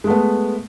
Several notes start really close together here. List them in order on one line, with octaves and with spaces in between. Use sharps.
G#3 A3 B3